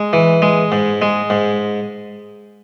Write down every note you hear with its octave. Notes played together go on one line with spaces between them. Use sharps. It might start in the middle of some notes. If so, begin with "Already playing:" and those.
Already playing: G#3
E3
G#3
G#2
G#3
G#2